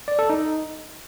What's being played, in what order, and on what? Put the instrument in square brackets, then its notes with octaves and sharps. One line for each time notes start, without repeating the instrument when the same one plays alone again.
[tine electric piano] D5
A4
D#4